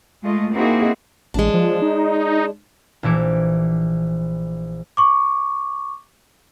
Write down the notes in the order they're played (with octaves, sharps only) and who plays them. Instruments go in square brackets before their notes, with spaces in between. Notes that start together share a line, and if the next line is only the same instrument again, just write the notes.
[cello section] G#3 A3 F4 D#5
A#3 C4 D#4 E4 F#4 G#4
[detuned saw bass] A1 [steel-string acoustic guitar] G#3 D4
[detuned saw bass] F3
D#4
[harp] A#1 E3 E4 D6
[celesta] C#6 D6